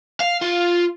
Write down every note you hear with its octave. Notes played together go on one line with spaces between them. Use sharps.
F5
F4